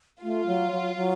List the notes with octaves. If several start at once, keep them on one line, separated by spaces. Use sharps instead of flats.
A3 F4
F#3
F#3
F#3